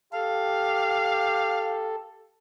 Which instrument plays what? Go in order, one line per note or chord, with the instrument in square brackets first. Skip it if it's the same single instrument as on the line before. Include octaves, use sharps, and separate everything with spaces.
[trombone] G4 [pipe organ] A4 [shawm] F5